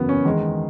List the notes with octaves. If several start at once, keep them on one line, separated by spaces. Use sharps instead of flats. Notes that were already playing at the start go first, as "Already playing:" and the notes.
Already playing: F#1 E2 C#3 F#3 B3
C#4
E2 D#3 G#3